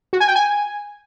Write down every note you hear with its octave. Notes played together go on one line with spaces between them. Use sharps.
F#4
G#5
G5
G#5